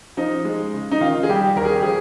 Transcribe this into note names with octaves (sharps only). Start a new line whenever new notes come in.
F3 D#4
G#3
C#3
D#4
D#3 F4
G#4
G3 G4
D#2 A#4
G#4
G4
F3 G#4